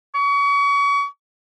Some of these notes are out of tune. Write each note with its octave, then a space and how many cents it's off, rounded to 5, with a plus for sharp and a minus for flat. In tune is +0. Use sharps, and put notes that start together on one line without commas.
C#6 +35